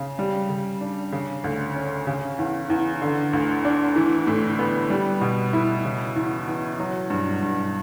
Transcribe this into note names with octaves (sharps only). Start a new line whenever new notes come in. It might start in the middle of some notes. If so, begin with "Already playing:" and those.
Already playing: C#3
G3
C#3
D4
C#3
D2
C#4
C#3
E2
E2
D3
D2
D4
E3
A2
B3
G3
B2
E4
C#3
E2
E2
F#3
G2
G2